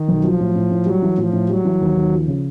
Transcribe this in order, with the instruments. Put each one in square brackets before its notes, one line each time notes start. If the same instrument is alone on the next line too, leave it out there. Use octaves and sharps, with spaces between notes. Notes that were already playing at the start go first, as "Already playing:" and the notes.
Already playing: [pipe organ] D#3
[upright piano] B1
[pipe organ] F3 [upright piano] F#3
[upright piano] A2
A2
A2
[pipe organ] F#3 [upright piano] G3
[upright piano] E3
[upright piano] A2 [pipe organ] F3
[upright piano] A2
[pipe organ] F#3 [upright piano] G3
[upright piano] E3
D#2
D#2
F3
C#3